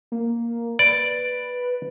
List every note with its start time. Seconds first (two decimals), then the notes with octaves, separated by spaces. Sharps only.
0.12 A#3
0.79 B4 D5